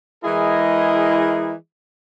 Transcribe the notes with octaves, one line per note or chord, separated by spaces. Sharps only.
E3 G#3 E4 G#4 A#4 D#5